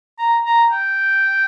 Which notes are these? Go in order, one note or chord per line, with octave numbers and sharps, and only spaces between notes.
A#5
A#5
G5